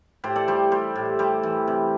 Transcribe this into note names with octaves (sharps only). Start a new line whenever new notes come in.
A2 G4 C5
A4 D5
G3 G4 C5
G3 G4 C5
A2
G3 G4 C5
E3
C3